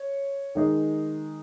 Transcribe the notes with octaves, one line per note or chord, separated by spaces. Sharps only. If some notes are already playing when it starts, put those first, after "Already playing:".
Already playing: C#5
D#3 G#3 D#4 G#4